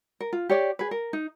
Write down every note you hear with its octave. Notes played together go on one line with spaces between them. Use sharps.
A#4
F4
G4 C#5 D5
G#4 B4
A#4
D#4